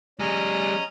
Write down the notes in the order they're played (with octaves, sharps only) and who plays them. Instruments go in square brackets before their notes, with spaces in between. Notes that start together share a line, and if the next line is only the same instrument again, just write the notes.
[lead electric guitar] G3 G#4 [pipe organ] C#4 D#5 A#5